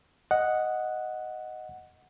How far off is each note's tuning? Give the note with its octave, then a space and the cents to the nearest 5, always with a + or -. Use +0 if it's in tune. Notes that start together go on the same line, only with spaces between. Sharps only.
D#5 +0 F#5 +0